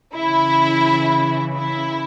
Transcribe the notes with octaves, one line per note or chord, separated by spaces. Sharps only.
C#3 E3 E4
E4